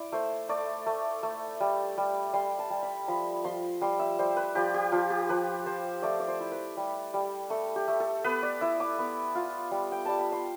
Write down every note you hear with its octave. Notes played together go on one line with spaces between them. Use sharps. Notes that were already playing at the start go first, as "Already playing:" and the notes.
Already playing: E4 D5
A3 C5
A3 D5
A3
A3
G3
G3
G3 C6
A5
G3
B5
F3 B5
F3 C6
G3 C6
E5
G3 C5
B4
F3 G4
G4
F3 F4
G4
F3 B4
F3 C5
A3 D5
D5
C5
E4
B4
G3
G3
A3 A4
G4
A3
A4
B3 B4
D5
E4 E5
D6
B3
F4
G3
G5
G3 A5
B5
C6